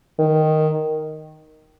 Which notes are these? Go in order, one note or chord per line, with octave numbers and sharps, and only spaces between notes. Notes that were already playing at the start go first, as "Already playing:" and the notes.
D#3